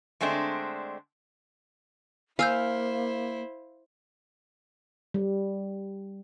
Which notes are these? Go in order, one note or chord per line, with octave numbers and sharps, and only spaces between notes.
D3 G#3 A3 C4 D4
A#3 E4 C5 F5 G#5 E6 G6
G3